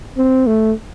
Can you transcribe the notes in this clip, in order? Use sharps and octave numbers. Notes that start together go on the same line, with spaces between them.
C4
A3